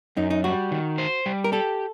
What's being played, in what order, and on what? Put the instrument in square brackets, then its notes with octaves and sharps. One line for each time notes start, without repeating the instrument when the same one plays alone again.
[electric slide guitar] F#2 [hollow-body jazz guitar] D#4
[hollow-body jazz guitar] D#4
[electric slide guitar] G3 [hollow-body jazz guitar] F#4
[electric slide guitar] D#3
C5
G3
[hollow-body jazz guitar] A#4
[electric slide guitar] G4 [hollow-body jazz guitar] A4